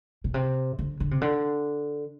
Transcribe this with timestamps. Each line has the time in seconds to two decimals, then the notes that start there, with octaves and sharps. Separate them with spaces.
0.24 B2
0.34 C3
0.79 D3
1.00 D3
1.11 C3
1.21 D3